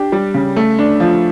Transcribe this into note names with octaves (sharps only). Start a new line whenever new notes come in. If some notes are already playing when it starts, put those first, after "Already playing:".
Already playing: D4 G4
G3
C#3
A3
D4
F3